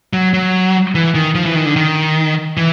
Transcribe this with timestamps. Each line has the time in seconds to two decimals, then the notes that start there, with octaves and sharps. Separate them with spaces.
0.13 F#3
0.33 F#3
0.95 E3
1.15 D#3
1.35 F3
1.46 E3
1.55 D#3
1.66 D3
1.76 D#3
2.57 E3